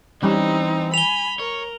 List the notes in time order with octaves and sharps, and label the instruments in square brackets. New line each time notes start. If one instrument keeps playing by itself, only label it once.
[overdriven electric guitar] E3 [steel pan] G3 C#4 [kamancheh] C4 D#4
[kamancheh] G#5 B5 [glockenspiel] F7 G7
[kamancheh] A#4 [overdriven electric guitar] C#5